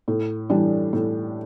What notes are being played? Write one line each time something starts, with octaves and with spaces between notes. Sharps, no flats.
A2
E3 G3 D4 G4
A2